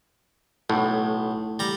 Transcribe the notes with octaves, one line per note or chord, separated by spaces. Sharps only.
B1 A2
G3 A#5